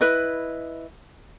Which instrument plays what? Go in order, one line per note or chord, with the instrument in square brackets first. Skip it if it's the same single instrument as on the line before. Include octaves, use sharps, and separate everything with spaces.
[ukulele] E4 B4 D#5